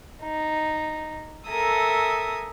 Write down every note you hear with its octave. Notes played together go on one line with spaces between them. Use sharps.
D#4
A4 A#4 E5 G#5 D#6